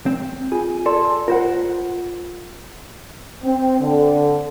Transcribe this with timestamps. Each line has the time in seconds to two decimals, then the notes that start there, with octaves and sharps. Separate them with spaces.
0.06 C4
0.52 F4 G#4 G#5
0.86 A4 D5 C6
1.28 F4 A#4 C5 F#5
3.44 C4
3.80 D3